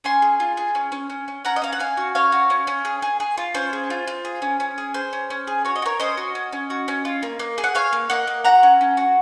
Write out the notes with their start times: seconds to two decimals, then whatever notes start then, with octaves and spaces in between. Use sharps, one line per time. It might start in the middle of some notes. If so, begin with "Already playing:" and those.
0.04 C#4 G#5 C6
0.22 G#4
0.40 F4
0.57 G#4
0.75 C#4
0.92 C#4
1.10 C#4
1.28 C#4
1.45 C#4 F#5 A#5
1.56 D#5
1.62 C#4 F5
1.73 F#5
1.79 C#4 F5 G#5
1.97 F#4
2.15 C#4 C#5 F5
2.32 F#4
2.50 C#4
2.67 C#4
2.85 G#4
3.02 G#4
3.20 G#4
3.38 F4
3.54 C#4 C5
3.73 G#4
3.90 F4
4.07 F4
4.25 G#4
4.42 C#4
4.60 C#4
4.78 G#4
4.94 G#4 C5
5.13 C#4
5.30 C#4
5.47 G#4
5.65 F#4 C#5
5.76 D#5
5.82 F#4
5.86 A#4 C#5
6.00 C#4 C5 D#5
6.17 F#4
6.35 C#4
6.52 C#4
6.70 F#4
6.88 C#4
7.05 F4
7.23 A#3
7.39 A#3
7.58 G#4
7.64 F#5
7.75 G#4 C#5 F5
7.93 A#3
8.10 A#3 D#5 F#5
8.27 A#3
8.44 F#4 F#5 A#5
8.63 C#4
8.81 C#4
8.97 F#4